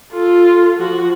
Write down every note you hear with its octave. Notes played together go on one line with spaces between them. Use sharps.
F4 A4
F3 F#4